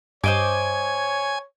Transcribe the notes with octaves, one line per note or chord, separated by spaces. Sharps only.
G2 C5 C#5 D#5 G#5 D6